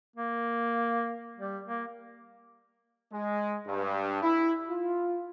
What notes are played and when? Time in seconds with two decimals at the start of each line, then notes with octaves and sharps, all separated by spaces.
0.16 A#3
1.37 G3
1.66 A#3
3.12 G#3
3.67 G2
4.22 E4
4.69 F4